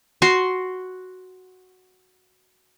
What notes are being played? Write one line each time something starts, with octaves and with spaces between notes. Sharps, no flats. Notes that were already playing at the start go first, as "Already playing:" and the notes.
F#4 C6